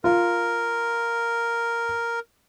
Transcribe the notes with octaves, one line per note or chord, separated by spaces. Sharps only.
F4 A#4